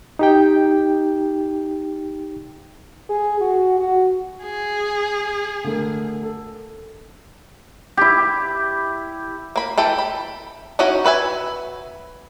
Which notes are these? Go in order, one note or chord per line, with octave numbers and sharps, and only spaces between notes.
D#4 G4 G5
G#4
F#4
F#4
G#4
D3 A3 A#4
A4
E4 G4
A#3 B5
E3 A4 G5 B5
B5
C#4 D#4 E4 F#4 D#5
F#4 B4 E5 G#5